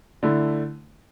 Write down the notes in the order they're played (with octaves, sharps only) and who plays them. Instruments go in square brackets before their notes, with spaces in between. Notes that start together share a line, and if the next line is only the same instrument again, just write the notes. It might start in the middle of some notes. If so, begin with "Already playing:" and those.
[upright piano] D3 A3 E4